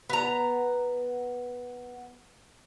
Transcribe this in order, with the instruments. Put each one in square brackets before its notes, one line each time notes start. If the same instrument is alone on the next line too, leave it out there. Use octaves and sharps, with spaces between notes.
[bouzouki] B3 A#5